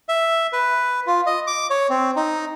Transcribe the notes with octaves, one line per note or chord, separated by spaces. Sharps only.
E5
B4
F4
D#5
D6
C#5
C4
D#4